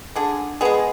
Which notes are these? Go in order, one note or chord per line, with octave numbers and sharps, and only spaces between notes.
D3 G#4
G#3 B3 G#4